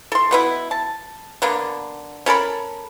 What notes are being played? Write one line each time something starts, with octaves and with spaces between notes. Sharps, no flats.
A4 C6
B2 B3 E4
A5
D3 A#3 B3
C#4 A4 A#4 B5